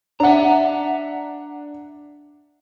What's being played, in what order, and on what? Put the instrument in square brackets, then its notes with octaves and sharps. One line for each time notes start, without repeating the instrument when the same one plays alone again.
[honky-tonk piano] D4 F#5 [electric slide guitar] E5 A#5